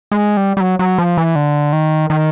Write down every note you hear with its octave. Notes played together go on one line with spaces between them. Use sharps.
G#3
G3
G3
F#3
F#3
F3
E3
D3
D#3
D#3